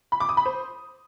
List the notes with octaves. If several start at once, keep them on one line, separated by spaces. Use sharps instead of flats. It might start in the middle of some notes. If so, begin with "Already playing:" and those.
B5
D6
D#6
B5
C5